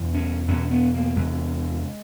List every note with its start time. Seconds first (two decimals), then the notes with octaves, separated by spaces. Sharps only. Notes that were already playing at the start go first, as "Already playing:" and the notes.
Already playing: E2 B2
0.14 C#4
0.48 E2 B2 C#4
0.71 B3
0.94 A#3
1.16 E2 C3 G#3